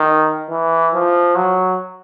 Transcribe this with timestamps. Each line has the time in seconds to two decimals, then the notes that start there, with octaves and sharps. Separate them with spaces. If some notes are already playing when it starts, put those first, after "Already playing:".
Already playing: D#3
0.50 E3
0.94 F3
1.36 F#3